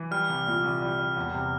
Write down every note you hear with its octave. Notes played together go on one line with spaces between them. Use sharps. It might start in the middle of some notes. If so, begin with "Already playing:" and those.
Already playing: E3
G3 F6
C2
A#2
C2
G3
G3
E2
C3